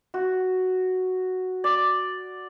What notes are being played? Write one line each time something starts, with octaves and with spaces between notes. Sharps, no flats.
F#4
D5